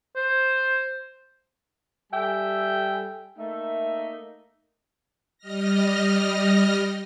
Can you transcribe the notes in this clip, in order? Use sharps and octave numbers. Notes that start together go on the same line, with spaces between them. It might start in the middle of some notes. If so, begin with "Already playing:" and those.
C5
G3 A4 E5 G5 G#5
A3 A#3 D#4 E5
G3 D#5 F6 A#6